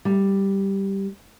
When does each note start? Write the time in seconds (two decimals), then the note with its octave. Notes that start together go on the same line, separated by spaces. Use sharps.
0.05 G3